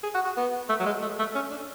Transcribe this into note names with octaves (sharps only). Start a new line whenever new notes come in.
G#4
F#4
F#4
B3
A3
F#3
G#3
A3
A3
C#4
D4